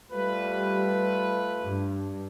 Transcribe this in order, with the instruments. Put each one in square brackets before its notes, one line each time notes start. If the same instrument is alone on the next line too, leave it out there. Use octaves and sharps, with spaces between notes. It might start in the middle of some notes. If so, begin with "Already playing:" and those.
[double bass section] G3 [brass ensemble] A3 F4 B4
[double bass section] G2